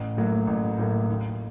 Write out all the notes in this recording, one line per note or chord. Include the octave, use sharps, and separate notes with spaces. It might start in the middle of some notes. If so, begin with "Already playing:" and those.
Already playing: A1
A2 F#3 A#3
A1
A2 F#3 A#3
D#2